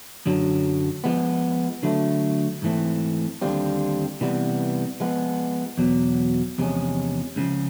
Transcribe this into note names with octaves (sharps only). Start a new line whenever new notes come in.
F#2 D3 F#3
F3 G#3 B3
D3 F#3 A3
G#2 E3 A3 C4
D#2 D3 G3 C4 F4
C3 E3 G3 B3
F3 G#3 B3
E2 B2 F#3
E2 C3 F3 G#3 C#4
C#2 C#3 F3